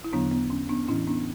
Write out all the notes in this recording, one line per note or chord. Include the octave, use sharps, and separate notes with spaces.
E4
E2 D3 F#3 B3 D4
B3
C#4
B3 D4
A2 E3 C#4 E4
B3 D4